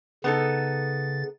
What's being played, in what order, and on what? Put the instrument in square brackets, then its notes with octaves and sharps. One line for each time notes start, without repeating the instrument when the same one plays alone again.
[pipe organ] C#3 A6 [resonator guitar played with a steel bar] B3 D#4 A4